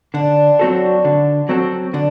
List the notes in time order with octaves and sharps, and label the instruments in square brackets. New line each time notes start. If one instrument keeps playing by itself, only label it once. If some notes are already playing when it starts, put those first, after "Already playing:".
[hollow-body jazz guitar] D3 [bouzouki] D4
[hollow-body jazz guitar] F#3 C4 F#4 A4
D3
F#3 C4 F#4 A4
[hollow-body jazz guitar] D3 [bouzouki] D4